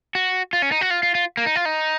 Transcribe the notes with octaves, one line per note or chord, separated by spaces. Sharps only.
F#4
F4
C#4
D#4
F#4
F4
F4
F4
A#3
D#4
F4
D#4